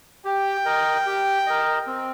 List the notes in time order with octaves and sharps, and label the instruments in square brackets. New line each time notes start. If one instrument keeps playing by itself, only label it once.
[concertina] G4 [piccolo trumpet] G5
[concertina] A#4 D#5
G4
A#4 D#5
C4